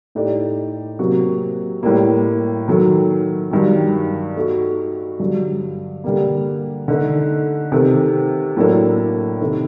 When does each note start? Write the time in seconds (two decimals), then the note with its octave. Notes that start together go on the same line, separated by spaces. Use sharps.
0.15 A2 A3 D#4 G4 D5
0.99 C3 F#3 A#3 F#4
1.83 A2 G3 A#3
2.68 D#3 F#3 A3
3.51 G2 D#3 F#3
4.36 A3 D#4 F#4
5.20 G2 D3 F#3
6.04 D3 G3 A#3
6.88 D3 A3 D#4
7.72 C3 D#3 A3
8.57 A2 F#3 A#3 D4 A4
9.40 C3 D#3 A3 D#4